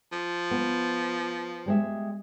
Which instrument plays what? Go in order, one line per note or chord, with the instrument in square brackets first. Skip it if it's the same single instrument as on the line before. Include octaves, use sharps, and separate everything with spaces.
[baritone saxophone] F3
[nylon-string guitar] B3
G3 G#3 E5